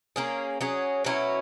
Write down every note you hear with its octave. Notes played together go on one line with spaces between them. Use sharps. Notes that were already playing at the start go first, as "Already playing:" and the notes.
A#3 C#4 G#4
F#3 C#4 G#4
B2 F#3 C#4 E4